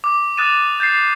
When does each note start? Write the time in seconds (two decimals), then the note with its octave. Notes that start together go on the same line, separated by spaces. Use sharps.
0.04 D6
0.37 D#6 F#6 A6 D#7 E7
0.80 G6 A6 C7